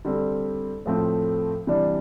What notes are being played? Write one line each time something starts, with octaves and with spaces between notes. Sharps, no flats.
D3 G3 C4
A2 F3 A3 C4
C3 E3 G3 D4